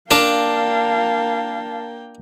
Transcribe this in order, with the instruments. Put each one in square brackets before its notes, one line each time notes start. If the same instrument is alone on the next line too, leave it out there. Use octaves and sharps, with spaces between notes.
[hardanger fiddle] A#3 G5 [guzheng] D4 [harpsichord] F4 A#4 D6 [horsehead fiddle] F5 A5